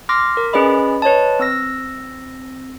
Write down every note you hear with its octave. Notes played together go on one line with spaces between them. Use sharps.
C6 D6 F6 A#6
A#4
C#4 G#4 B4 D5 D#5 B5
B4 C#5 D#5 A5
C4 E6 A#6